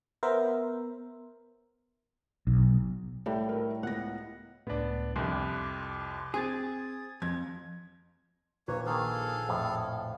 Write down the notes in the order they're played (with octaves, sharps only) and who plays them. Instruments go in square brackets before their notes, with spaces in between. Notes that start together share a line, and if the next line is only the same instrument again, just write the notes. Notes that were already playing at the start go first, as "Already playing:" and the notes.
[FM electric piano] B3 A#4 C5 E5
[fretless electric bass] B1
[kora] A2 G3 [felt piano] A5
[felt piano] A3 A#4
[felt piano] C#2 B3 A#6 [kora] F#5
[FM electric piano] C#2 A2 [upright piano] B3 D4
[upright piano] C2 F2 [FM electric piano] C6 D6 F#6
[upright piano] C4 [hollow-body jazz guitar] G#4 [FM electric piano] D#6 G#6 A6
[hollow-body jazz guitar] F2 [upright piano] G#6
[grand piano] A#1 B4 [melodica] A#3 C#5
[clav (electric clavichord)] D#3 A#3 [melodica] G#4 A4 F5
[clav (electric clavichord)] F2 A2